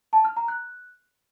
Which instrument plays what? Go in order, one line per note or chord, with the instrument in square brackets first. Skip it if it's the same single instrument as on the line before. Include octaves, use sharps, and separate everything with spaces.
[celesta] A5
F6
A#5
F#6